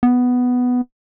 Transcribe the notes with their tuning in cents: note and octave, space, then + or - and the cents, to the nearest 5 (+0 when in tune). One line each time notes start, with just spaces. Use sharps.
B3 +5